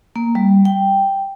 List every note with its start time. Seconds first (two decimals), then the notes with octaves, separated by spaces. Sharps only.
0.16 A#3
0.35 G3
0.65 G5